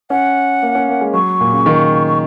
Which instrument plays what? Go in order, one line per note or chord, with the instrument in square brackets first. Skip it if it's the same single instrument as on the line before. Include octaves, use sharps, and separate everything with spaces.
[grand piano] C#4 [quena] F#5
[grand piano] A#3
C#4
A#3
G#3
[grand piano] F#3 [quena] C#6
[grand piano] A#2
C#3
D#3
[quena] C#6